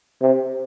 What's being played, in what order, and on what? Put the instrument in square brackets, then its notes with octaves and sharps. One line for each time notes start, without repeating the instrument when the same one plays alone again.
[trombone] C3